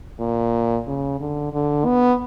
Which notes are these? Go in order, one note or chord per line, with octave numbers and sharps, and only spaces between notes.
A#2
C#3
D3
D3
B3